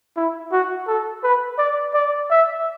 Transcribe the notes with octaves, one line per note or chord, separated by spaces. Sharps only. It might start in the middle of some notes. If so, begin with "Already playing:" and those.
E4
F#4
A4
B4
D5
D5
E5